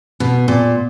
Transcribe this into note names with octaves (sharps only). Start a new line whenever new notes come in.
B2
A#2